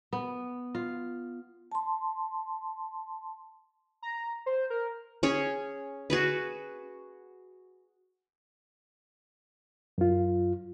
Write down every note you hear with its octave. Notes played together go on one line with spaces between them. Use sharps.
B3
F4
A5 C6
A#5
C5
A#4
C#4 G#4 C#5
F#4 G#4 B4
F#2 F4